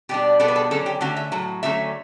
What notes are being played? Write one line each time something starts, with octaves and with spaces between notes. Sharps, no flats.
B2 G3 D4 G4
B2 G3 B3 D4 A4
B4
A4
D3 F#3 C#4 A4
G4
D3 A3 C#4 F#4
E5
A2 F#3
D3 F#3 A3 C#4 E5